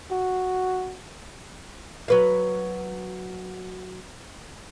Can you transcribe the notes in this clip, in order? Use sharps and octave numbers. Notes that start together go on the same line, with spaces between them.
F#4
F#3 B4 F5